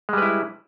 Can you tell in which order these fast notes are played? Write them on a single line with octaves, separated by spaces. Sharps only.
G#3 G3 B4 E4